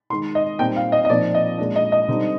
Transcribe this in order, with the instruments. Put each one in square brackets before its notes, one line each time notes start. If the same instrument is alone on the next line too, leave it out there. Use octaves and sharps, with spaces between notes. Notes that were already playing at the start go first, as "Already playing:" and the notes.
[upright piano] D#3 G#3 D#4 C6
D#5
A#2 G3 C4 D#4 G5
F5
D#5
D#5
A#2 F3 C4 D#4 D5
D#5
A#2 G#3 D4
D#5
D#5
D3 G3 C4 D#4